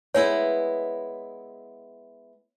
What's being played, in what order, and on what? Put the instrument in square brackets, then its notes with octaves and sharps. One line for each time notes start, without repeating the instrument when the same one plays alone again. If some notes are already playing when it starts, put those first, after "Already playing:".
[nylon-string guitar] G#3 B3 E4 [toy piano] C#5